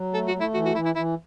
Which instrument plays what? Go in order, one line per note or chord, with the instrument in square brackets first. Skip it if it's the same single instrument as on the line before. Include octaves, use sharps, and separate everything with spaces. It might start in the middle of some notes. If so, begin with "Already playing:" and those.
Already playing: [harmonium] F#3
[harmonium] A3 [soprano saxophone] A4
[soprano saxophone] F#4
[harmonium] A3
[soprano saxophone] E4
[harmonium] E3 [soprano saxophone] F#4
[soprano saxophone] F#4
[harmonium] E3 [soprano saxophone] E4
[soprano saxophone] E4
[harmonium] E3 [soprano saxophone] E4